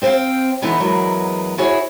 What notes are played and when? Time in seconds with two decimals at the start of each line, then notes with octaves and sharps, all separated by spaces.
0.02 C4 C5 D5 F5 G5
0.62 D3 E3 B3 D#4
0.80 E2 F#3 G#3 A#4 B4
1.58 E4 F#4 G#4 C#5